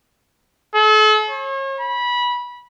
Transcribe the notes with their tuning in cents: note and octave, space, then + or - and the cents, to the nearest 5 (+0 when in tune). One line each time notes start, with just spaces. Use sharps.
A4 -40
C#5 -40
B5 -20